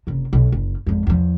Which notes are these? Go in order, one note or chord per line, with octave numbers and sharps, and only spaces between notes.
F#1 C3
B1
F#1
G#1 F2
E2 F3